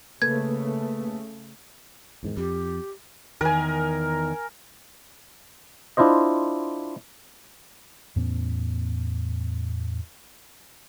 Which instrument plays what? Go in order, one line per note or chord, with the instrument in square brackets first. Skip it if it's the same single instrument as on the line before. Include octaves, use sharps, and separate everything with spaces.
[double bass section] C#3 A3 [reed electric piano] A#3 A4 B4 [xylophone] G#6
[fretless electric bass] E2 G#2 D#3
[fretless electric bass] F2 [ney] G4
[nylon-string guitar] E2 D#3 [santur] A#4 G#5
[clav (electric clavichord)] D4 E4 F4 C5 D#5
[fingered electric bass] E2 A2 B3 C#4